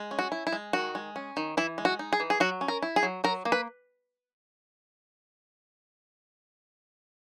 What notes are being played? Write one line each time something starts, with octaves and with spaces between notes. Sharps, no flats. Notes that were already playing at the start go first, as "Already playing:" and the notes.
Already playing: G#3
C#4
F#4
E4
E4
G#3
D#3 F#4
G#3
C#4
D#3
E3 E4
G#3
F#4
D#4
G#4
E3
G#4
F#3 F#4
C#4
A#4
E4
G#4
F#3
F#3 A#4
A#3
B4